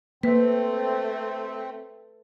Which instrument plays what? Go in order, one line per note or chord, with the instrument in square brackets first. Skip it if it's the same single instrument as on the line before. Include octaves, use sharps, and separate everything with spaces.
[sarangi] A3 [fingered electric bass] A#3 [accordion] C4 [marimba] B4